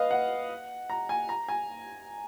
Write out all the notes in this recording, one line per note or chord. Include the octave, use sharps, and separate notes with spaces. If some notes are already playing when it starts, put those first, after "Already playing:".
Already playing: B4 D#5 F5
F#5
A#5
G#5
A#5
G#5